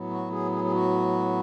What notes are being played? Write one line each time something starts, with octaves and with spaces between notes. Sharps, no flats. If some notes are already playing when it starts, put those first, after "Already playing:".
Already playing: A2 F#3 B3
F#4
G#4
G#4
G#4
F#4